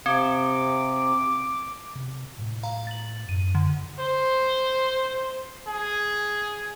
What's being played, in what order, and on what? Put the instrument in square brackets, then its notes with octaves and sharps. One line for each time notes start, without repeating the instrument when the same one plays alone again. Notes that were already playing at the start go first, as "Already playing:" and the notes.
[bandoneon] C3 [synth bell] C4 [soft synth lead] D6
[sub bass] C3
A2
[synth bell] F5 A#5
A6 F#7
[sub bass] F#2 [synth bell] D#7
[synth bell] D3
[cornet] C5
G#4